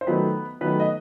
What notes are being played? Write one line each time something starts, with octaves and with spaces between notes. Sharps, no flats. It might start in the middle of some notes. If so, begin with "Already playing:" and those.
C5
D#3 F#3 A3 B3 B4
D#3 F#3 A3 B3 B4
D#5